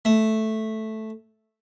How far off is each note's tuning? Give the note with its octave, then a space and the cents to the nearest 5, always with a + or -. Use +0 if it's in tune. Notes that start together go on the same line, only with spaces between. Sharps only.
A3 -5